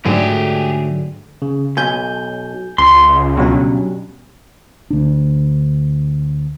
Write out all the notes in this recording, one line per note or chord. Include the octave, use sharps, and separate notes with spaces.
G#2 D3 F#3 A3 G4 G#4
C#3
B1 G#5 G6
C#2 C6
G2 B2 F#3 C#4
D2 D4